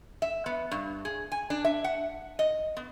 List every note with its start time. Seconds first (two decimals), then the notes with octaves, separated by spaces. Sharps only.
0.22 E5
0.46 B3
0.71 G2
1.05 G#4
1.32 G#5
1.50 D4
1.65 E5
1.84 F#5
2.39 D#5
2.77 B3